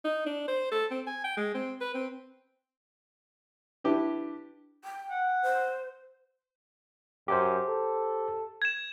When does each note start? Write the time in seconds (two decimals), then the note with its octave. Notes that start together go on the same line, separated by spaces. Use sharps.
0.05 D#4
0.26 D4
0.48 C5
0.72 A4
0.91 C4
1.07 G#5
1.24 G5
1.37 G#3
1.55 C4
1.81 B4
1.95 C4
3.84 D4 E4 G4 B4
4.84 G5
5.10 F#5
5.42 C5
7.28 F#2 G4 C5
7.68 A4
8.62 G#6 E7